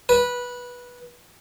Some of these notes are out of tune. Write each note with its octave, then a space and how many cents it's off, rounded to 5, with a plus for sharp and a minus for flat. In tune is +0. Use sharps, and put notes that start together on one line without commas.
B4 -15